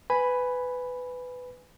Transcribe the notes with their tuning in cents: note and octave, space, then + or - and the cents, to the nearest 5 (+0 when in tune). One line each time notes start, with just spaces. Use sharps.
B4 +15 G#5 +0 B5 +0